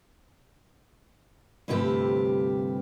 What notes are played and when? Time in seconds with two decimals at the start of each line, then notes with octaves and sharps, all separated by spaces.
1.68 D2 G2 C3 F3 G4 B4